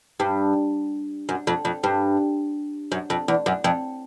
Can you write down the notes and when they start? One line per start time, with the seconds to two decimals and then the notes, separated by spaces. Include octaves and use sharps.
0.20 G2
1.29 F#2
1.47 F2
1.65 F2
1.84 G2
2.92 F#2
3.10 F2
3.28 E2
3.46 F#2
3.64 F2